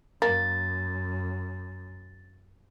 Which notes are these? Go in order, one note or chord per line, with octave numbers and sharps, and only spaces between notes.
F#2 A#3 A6